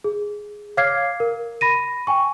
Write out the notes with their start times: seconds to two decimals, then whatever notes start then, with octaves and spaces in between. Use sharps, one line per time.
0.04 G#4
0.77 C#5 F5 D6 F6 G#6 C7
1.20 A#4
1.61 B5 A#6 D#7
2.07 G5 G#5 C#6